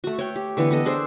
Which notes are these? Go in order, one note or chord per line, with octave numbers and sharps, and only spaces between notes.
A3 F#4
C#5 G5
G4
D3 E3 B3
B3 A4 D#5
D4 G#4 A4 C5